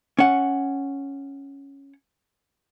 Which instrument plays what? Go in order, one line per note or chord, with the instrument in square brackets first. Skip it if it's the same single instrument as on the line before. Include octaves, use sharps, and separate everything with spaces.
[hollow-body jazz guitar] C#4 F#5